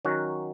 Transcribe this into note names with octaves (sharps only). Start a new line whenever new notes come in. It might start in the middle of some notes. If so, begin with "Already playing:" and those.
D#3 F#3 C#4 F#4